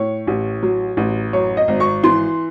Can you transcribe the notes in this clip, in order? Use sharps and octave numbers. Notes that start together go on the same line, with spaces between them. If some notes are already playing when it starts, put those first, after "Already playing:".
Already playing: A2 C#5
A1
F#3
A1
F#2 C#5
D#5
G#1
C#6
E3 C6